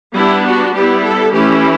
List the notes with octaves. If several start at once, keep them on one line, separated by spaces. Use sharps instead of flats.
G3 B3 D4 E4
F#4
G3 B3 E4 G4
A4
E3 A3 C#4 E4 G4